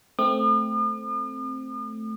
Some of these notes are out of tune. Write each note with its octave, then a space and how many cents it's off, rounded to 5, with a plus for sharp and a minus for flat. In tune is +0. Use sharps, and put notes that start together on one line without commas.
A3 +0 C4 +0 D#6 -45